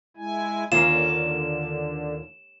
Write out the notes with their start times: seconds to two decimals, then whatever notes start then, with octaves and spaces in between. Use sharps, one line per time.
0.17 G#3 E4 G#5
0.72 D#2 D3 A#3 C#4 F4 E7